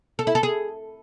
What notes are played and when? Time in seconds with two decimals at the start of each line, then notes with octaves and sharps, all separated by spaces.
0.19 A4
0.27 E4
0.35 A4
0.43 G#4